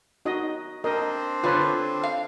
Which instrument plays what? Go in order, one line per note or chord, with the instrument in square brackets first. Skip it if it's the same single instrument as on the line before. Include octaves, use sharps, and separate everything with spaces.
[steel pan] D#4 F#4 D#5
[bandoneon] C4 D4 C5 [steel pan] A#4 D#5
[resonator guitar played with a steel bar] D3 [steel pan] F4 B4 C#5
[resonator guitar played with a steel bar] F5